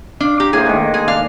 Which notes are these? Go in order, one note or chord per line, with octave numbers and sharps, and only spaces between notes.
D4 F5
G4 A#5
A2 A#3 G#4 C5
D#3 G#3
G#4
D4 F5